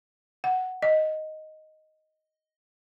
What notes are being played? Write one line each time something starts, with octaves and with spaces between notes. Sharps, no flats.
F#5
D#5